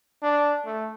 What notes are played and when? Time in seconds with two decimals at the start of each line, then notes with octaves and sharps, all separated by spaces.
0.22 D4
0.65 A3